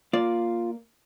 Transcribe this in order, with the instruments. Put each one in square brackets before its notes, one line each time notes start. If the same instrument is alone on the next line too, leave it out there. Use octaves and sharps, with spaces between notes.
[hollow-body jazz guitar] A#3 D5 [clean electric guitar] F4